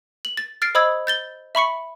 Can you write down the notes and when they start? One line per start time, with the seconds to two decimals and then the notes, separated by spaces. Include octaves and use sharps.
0.25 F#7
0.37 A6
0.62 F6 A6 C7 D7
0.75 C5 D#5 B5 D#6 E6 G#6
1.07 G6 A6 G7
1.55 E5 B5 C#6 C#7